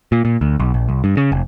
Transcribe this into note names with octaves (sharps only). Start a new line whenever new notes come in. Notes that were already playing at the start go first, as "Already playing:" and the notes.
A#2
A#2
D2
B1
A#1
C2
G2
C#3
F1